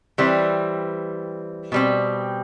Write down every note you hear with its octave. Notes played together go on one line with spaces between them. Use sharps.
E3 G3 C4
B2 G3 C4